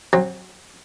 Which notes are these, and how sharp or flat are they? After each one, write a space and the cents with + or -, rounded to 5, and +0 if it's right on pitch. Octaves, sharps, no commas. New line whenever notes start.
F#3 +0 C4 +35